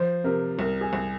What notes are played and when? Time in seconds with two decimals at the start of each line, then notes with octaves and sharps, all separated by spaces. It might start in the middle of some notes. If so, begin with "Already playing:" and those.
Already playing: F3 C5
0.24 C3 A#4
0.58 C2 A#4
0.81 G#4
0.93 C2